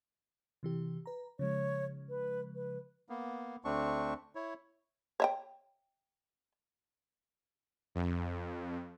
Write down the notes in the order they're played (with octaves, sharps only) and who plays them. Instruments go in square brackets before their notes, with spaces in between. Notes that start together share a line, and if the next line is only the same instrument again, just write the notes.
[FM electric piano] C3 E3 G4
B4 A#5
[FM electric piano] C#3 F3 G#3 [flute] C#5
[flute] B4
B4
[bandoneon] A#3 B3
D2 A3 C4 D4 C#6
E4 C#5
[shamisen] C#5 E5 G5
[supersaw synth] F2